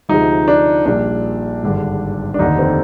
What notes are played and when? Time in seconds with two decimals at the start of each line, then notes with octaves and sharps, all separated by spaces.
0.09 D2 C3 F3 G#3 D#4
0.48 D4
0.85 A#1 A#2 G3 A#3 D4
1.63 G#1 G2 D3 G#3
2.34 D4
2.39 F1 D#2 D3 D#4
2.59 C4